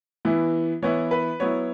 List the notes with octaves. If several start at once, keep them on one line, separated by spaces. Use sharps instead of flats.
E3 B3 E4
E3 B3 E4 C#5
B4
F#3 B3 E4 C#5